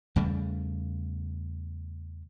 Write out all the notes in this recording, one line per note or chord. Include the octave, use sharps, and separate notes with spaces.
E2 C#3 G3 A3